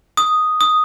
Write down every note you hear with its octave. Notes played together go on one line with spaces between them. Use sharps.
D#6
D#6